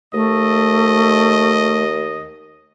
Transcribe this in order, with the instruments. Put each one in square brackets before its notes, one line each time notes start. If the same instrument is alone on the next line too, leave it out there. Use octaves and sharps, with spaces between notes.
[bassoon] D#2 [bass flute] A3 [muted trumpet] D#5